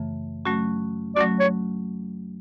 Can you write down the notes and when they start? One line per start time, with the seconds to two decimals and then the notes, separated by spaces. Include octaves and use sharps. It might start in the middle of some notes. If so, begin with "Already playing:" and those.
Already playing: F#2 C#3 E3 A3
0.45 F#3 A3 C#4 F#4
1.16 F#3 A3 C#4 F#4 D5
1.40 C#5